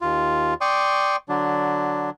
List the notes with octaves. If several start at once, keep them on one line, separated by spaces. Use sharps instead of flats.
D#2 F4
D5 G5 C6 C#6 D#6
D3 F#3 D4